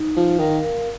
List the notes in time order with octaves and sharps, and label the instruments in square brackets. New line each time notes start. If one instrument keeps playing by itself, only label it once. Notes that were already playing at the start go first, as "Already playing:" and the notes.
Already playing: [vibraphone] D#4
[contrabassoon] F3
[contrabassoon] D#3 [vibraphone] A#4 F5